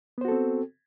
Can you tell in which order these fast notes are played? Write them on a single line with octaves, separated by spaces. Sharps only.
B3 C5 F#4 A4 C4